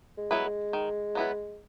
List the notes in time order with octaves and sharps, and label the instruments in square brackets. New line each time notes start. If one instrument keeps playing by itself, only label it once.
[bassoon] G#3
[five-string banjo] F#3 B3 E4 B4
[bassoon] G#3
[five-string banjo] D#3
F#3 B3 E4 B4